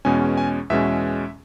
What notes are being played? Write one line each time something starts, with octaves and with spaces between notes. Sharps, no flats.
E2 B2 G#3 C#4 G#5
G#5
E2 B2 G#3 C#4 E5